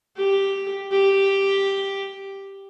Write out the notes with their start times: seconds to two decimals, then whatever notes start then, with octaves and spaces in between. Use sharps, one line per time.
0.17 G4
0.92 G4